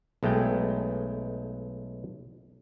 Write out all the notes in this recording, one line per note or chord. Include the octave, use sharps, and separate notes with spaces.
B1 G#3 A3 G5